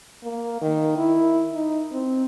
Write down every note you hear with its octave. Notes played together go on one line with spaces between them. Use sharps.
A#3
D#3
E4
D#4
C4